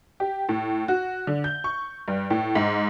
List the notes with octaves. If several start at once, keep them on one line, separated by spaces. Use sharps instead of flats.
G4
A2
F#4
D3
G6
C#6
G2
A2
G#2